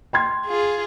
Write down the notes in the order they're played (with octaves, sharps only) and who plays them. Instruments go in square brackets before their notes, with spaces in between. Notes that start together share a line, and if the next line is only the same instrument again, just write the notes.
[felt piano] G5 C6 G#6
[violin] F4 G#4